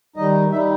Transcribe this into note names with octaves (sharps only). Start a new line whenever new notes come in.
D#3 G3 D#4 D#5
D#3 G3 D#4 E5